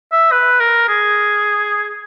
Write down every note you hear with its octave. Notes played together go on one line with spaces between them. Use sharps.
E5
B4
A#4
G#4